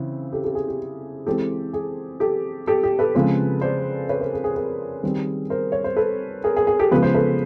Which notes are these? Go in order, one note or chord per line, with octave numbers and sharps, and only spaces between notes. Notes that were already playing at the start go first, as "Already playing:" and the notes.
Already playing: C#3 E3 C4
G4 A4
G4 A4
G#4
G4
E3 G#3 C4 G4 A4
G#4
G4 A4
G4 A4
G4
A4 B4
C#3 F3 G#3 C4
C5 D5
B4 C#5
A#4 C5
G#4
G#4
G#4 A#4
D#3 G3 C4
A#4 C5
C#5
C5
A4 B4
G#4 A#4
G#4
G#4
G4 A4
C#3 F3 G#3 B3 B4
C5
A4 B4